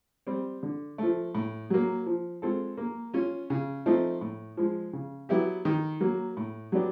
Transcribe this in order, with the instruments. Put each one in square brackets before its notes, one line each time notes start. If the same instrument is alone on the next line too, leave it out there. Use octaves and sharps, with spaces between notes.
[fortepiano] G3 C4
D3
F3 A3
A2
F#3 A#3
F3
G#3 C4 F4 A4
A#3
C#4 F4
C#3
F3 A3 C4 D#4
A2
F3 G#3
C#3
F#3 B3 E4 G4
D#3
F#3 A#3
A2
F#3 B3 D4 G4